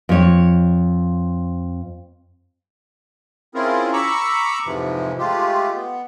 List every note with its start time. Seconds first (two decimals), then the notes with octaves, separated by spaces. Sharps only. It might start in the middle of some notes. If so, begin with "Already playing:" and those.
0.09 F2 C#5
3.55 C4 C#4 E4 F4 G#4 A#4
3.93 A#5 B5 C#6 D6 E6
4.66 F2 G#2 C3 E3 F3
5.19 G#3 A3 F4 G4
5.75 B3